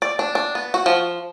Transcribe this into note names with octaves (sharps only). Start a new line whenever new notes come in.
D5
D4
D4
B3
F#4
F3